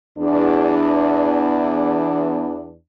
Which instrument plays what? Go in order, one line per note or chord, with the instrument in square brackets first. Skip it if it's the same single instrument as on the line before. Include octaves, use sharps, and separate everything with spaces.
[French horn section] E2 D4